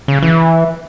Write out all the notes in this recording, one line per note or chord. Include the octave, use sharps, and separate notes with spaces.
C#3
E3